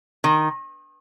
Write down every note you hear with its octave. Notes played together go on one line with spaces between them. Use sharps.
D#3